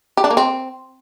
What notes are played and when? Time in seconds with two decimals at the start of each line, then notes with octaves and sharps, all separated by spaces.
0.17 G4
0.24 D4
0.30 A#3
0.37 C4